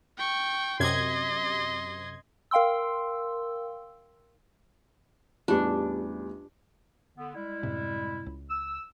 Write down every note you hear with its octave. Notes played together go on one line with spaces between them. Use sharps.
G5 C#6
F#2 C3 D#5 C6 G#6
A#4 F5 G5 C6 E6
A1 E2 G3 D4 F4 G4
D3 B3
G3 G#3 E4
F#2 A2 C3
C#2
E6